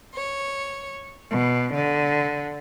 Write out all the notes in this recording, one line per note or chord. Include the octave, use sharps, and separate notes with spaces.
C#5
B2
D3